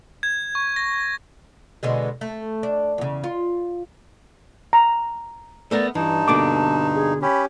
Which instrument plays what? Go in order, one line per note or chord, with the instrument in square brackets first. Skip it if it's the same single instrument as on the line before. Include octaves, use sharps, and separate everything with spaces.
[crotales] G#6
C#6
A#6
[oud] B2 D3 G#3
A3
D4
E2 C#3
F4
[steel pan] A#5
[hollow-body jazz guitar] A3 B3 A#4 [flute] D5
[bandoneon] G2 D#4 [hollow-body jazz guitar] E3 [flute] A5
[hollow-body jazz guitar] B2 D3 A#3 [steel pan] D6
[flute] G#4
[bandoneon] C#4 G4 [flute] B5